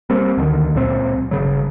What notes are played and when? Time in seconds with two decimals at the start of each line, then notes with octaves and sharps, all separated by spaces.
0.10 G3 A#3 C4
0.37 D2 D3 D#3
0.75 C#2 A#2 F#3 C4
1.31 G1 C#3 F#3